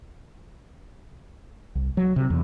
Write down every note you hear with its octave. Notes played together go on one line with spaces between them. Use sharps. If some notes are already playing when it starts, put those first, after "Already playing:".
C2
F#3
C3
E2